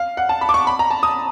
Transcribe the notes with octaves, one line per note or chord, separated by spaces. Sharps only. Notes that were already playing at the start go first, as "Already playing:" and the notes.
Already playing: F5
F#5
A5
B5
D6
C#6
B5
A#5
A5
D#6